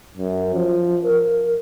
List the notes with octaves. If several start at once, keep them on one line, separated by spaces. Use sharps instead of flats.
F#2
F3
A#4